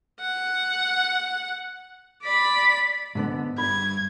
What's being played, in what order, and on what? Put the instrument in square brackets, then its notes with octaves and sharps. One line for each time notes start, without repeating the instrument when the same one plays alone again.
[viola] F#5
D5 B5
[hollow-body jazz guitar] G#2 D3 B3
[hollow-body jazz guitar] G2 B5 [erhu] G#6